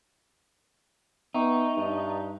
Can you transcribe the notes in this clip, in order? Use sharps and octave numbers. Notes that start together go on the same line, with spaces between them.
B3 D#4 E5 G5 C#6
G2